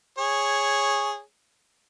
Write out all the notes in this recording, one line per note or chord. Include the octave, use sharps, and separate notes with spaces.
G#4 C#5